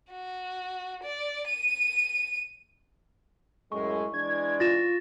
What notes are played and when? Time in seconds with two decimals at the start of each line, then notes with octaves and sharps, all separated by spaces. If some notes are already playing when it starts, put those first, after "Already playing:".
0.10 F#4
1.03 D5
1.47 D#7
3.72 F#2 A2 G#3 C#6
4.14 E3 G#3 D4 G#6
4.60 F4 A6 A#6 E7